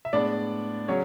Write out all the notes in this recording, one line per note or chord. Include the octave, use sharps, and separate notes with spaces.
E5
A2 G#3 B3 D4 D5
C#3 F#3 C#4 C#5